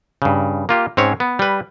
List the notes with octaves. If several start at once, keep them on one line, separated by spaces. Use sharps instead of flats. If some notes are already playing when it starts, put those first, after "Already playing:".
G2 C#3
A#3 F4 G4
G#2 C4 C#4 C#5
B3
G3 B4